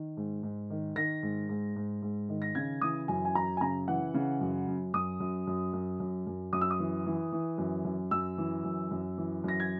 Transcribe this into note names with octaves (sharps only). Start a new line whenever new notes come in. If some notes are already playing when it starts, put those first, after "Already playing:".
Already playing: D#3
G#2
G#2
D#3
D#3 A#6
G#2
G#2
G#2
G#2
D#3
A#6
C#3 G#6
E3 D#6
F#2 G#5
G#5
F#2 A#5
G#5
C#3 A#5
E3 F#5
C#3
F#2
F#2
F#2 D#6
F#2
F#2
F#2
F#2
F#2
F#2 D#6
E6
D#6
E3
E3
E3
F#2
F#2
F#2 E6
E3
F#2
F#2
E3
F#2 A#6
G#6